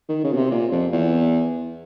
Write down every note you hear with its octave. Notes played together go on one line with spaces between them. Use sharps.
D#3
C#3
B2
C3
A#2
F2
E2